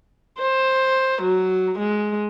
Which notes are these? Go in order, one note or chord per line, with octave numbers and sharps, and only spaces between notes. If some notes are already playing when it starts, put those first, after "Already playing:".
C5
F#3
G#3